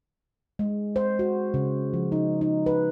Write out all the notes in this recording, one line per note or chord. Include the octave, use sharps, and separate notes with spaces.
G#3
C5
F#4
C#3
F3
D#4
D#4
B4